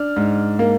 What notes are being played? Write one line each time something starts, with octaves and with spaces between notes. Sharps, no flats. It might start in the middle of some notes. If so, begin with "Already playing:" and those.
Already playing: D4 F6
G#2
A#3